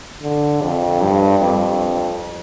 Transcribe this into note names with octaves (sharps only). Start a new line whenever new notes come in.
D3
F2
G2
F2